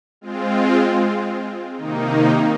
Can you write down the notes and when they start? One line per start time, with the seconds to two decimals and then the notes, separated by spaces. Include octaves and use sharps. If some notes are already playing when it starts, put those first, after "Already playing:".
0.21 G#3 C4 F4
1.75 C3 D#3 A#3 D#4